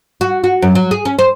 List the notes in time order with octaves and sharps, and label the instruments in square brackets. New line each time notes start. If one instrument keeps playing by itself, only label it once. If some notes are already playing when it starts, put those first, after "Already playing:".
[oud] F#4
F#4
F#2
F#3
G#4
C#4
C5